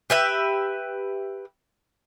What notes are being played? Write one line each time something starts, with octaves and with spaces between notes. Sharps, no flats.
G4 B4 E5